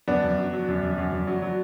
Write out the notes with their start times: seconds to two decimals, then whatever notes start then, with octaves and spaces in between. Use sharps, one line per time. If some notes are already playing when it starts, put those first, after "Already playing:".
0.08 F#2 B3 D4
0.24 F#2
0.38 F#3
0.53 F#3
0.68 F#2
0.83 F#2
0.98 F#2
1.13 F#2
1.27 F#3
1.42 F#3